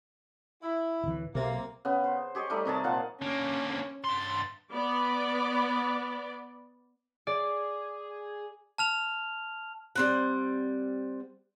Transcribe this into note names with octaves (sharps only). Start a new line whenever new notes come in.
E4
D1 E3
B1 C3 A#3
C#3 B3
C5
G4 G#4 C#5 D#5
G3 A3 D#4
C3 D#3 G#4 A5
A#2 F3 F5 F#5
D3 A#3 C#4
G2 C6 A6
B3 D5
G#4 D5
A5 F6 F7
G3 C4 F#5